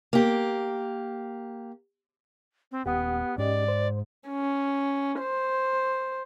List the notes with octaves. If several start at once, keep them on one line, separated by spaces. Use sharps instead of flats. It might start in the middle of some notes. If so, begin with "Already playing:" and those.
A#3 G4
C4
D#1 B3 G4 F#5 D#6
G#2 C#4 G4 D5 D#5
C5
C#4
C5